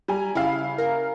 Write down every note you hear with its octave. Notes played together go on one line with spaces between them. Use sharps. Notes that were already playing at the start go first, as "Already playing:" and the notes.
G3 G#5 A#5
C#3 E4 F5
A#4